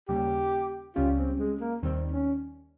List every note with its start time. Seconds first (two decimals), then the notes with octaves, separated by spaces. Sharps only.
0.08 D#2 C#3 G3 A#3 G4
0.95 C#2 C#3 G3 C#4 F4 G4
1.18 C4
1.39 G#3
1.60 A#3
1.83 D#2 D#3 G3 C4
2.12 C#4